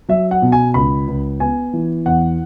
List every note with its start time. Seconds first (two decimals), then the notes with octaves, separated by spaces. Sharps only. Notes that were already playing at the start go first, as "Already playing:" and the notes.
0.09 F#3 E5
0.31 F#5
0.42 B2
0.52 G#5
0.74 C#2 B5
1.08 C#2
1.40 B3 G#5
1.73 E3
2.06 E2 F#5